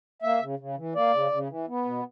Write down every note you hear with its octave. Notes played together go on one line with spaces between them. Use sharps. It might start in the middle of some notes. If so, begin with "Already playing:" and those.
A#3 E5
C#3
C#3
E3
A#3 D5
C#3
C#3
E3
B3
B2